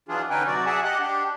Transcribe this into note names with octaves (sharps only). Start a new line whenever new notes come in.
E3 F#3 D4 F4 G#4
D3 C#4 D#4 B4 G5 G#5
C3 F#3 F#4 D5
G#4 D5 E5 F#5 G#5 A5
G4 D#5 F#5 F#6
D4 G4